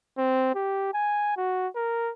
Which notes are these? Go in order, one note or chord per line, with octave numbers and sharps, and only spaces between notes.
C4
G4
G#5
F#4
A#4